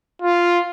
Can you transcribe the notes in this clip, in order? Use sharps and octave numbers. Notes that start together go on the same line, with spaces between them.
F4